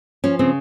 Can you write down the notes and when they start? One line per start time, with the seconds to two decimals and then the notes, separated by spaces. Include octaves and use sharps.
0.24 F3 C#4
0.39 C#3 C4